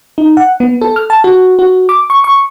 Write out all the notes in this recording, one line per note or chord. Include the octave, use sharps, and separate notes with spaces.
D#4
F#5
B3
A4
F6
A5
F#4
F#4
D6
C#6
C#6